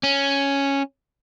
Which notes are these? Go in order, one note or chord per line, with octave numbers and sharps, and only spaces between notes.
C#4